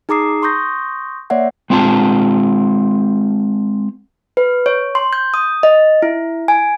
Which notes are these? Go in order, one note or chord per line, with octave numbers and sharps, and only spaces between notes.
D#4 G#4 A#5 D6 D#6 C7
C6 C#6 D#6 G6 A#6
A#3 C#5 D5 E5 F#5
G#3 C4 F4 F#5 A5
B4
C#5
C6
G6
D#6
D#5
E4
G#5